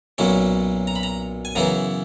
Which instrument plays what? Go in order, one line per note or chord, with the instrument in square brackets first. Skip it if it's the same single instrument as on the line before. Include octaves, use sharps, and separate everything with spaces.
[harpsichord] B1 A#2 F#3 C#4 E4
A#5
B5
A#5
G#5
F#2 C#3 E3 B3 E4 A#5